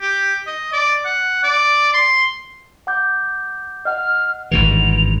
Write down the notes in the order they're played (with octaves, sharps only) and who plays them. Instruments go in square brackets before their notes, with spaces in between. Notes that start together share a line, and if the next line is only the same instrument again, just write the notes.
[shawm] G4
D#5
D5
F#5
D5
C6
[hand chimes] F#5 D6 G6
[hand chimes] D#5 F#5 [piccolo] F6
[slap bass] G#1 G2 E3 [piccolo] F7